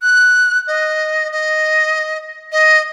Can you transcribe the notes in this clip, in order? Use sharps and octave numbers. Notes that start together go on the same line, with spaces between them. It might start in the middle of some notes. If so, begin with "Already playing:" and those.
F#6
D#5
D#5
D#5